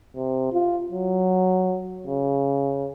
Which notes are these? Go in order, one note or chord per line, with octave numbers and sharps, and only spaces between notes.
C3
F4
F#3
C#3